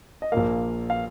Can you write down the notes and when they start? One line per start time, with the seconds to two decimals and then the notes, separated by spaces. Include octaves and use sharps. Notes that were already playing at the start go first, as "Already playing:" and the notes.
0.22 D#5
0.32 A#1 A#2 A#3 F5
0.90 F5